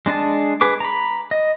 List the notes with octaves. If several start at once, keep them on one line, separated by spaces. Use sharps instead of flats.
G#3 D4 G#4 A5
G#4 B4 D6
A#5 B5
D#5